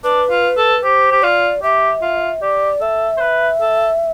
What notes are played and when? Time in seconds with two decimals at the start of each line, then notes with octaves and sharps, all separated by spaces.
0.04 D4 B4
0.30 F4
0.57 A4
0.83 G4 C5
1.12 G4
1.22 F4 D5
1.63 G4 E5
2.02 F4
2.42 G4 D5
2.81 A4 E5
3.17 C5
3.21 B4
3.61 A4